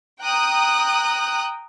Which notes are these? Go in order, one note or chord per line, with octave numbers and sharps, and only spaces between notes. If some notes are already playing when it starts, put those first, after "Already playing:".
G5 A#5 D#6 F#6